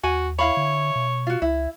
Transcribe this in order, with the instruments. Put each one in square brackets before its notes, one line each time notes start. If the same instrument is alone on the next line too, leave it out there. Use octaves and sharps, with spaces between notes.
[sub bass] D#2 [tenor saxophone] F#4 [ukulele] G#5
[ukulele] E4 F5 B5 [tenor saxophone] C#5
[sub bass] D3
B2
[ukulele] F4 F#4
[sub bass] C#2 [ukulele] E4